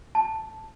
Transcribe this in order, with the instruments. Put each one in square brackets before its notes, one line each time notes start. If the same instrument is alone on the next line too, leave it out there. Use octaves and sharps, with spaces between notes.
[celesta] A5